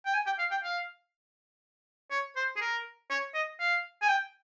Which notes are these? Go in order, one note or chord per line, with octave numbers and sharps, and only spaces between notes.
G5
G#5
G5
F5
G5
F5
C#5
C5
G#4
A#4
C#5
D#5
F5
G#5
G5